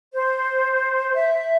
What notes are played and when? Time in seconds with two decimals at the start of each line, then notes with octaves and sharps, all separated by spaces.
0.13 C5
1.15 E5